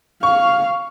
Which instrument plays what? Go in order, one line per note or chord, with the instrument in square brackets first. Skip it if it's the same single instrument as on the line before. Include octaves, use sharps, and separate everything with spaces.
[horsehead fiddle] F5 [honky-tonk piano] C#6